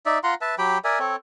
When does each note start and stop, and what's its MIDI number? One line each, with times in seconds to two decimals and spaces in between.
0.06 0.19 63
0.06 0.19 74
0.06 0.19 76
0.23 0.35 65
0.23 0.35 78
0.23 0.35 82
0.23 0.35 84
0.41 0.55 71
0.41 0.55 76
0.41 0.55 81
0.58 0.78 54
0.58 0.78 67
0.58 0.78 79
0.58 0.78 83
0.84 0.99 70
0.84 0.99 74
0.84 0.99 76
0.84 0.99 80
0.99 1.16 60
0.99 1.16 69
0.99 1.16 73